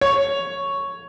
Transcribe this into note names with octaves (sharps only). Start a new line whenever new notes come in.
C#5